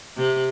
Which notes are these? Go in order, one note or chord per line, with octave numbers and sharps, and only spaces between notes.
C3